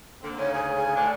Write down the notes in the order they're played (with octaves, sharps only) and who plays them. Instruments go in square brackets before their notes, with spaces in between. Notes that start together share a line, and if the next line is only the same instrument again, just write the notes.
[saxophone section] D3 A#3 C4
[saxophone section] D2 G#2 C#3 [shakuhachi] C#5
[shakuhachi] G#4
G#5
[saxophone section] A2 D4